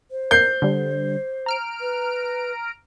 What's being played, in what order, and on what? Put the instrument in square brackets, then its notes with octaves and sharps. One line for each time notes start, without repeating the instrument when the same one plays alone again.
[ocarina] C5
[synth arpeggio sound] A#4 [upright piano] G6 C7
[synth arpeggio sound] D3 G3
A#5 F6 D7
[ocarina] B4